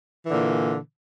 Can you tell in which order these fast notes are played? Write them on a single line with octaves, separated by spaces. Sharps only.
E3 D3 A#2